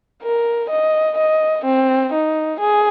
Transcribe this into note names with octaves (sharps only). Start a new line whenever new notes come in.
A#4
D#5
D#5
C4
D#4
G#4